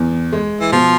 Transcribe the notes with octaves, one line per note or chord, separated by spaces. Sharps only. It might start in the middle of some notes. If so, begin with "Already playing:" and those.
Already playing: E2
G#3
E3
B2 F3